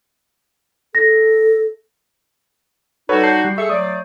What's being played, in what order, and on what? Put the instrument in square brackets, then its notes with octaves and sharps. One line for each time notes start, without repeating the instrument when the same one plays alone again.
[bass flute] A4 [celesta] A#6
[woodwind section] G3 D#4 F#4 [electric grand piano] A4 B4 C#5
[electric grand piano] A5 G6 C7
G3
[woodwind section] G#4 A4 C#6 [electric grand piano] E5
[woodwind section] F#3 A3 D5 [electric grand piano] D#6